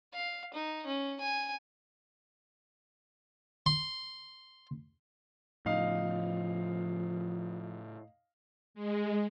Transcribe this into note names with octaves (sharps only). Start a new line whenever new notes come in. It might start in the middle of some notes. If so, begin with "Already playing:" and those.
F5
D#4
C#4
G#5
C6
A2 C#3 F3 D#4 F5
G#3